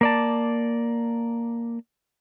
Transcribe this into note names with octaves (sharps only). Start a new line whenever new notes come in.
A#3 D5 A5